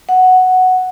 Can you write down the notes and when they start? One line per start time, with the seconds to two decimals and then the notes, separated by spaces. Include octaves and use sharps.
0.09 F#5